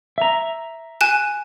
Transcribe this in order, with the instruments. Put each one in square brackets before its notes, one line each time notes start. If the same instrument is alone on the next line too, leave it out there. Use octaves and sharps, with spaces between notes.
[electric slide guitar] E5 A#5
[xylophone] G#5 F#6 E7